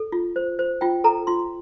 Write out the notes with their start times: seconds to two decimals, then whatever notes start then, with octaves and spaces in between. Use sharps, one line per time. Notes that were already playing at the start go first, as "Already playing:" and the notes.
Already playing: A4
0.12 F4
0.36 C5
0.59 C5
0.81 F4 G5
1.04 A4 A#5
1.27 F4 C6